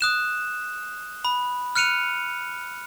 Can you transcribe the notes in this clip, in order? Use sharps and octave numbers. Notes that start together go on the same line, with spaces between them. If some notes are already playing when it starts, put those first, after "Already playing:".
D#6 F#6 E7
B5
F6 F#6 C#7 D#7 F7